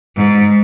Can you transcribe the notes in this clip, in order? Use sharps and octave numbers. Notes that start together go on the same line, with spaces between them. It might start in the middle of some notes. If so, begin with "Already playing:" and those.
G#2